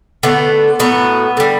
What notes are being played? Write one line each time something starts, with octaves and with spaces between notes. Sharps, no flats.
D3 A3 B3
A2 F#3 A3 B3
D3 G3